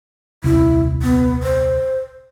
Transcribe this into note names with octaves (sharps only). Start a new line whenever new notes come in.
D#1 C2 E4
B3
C5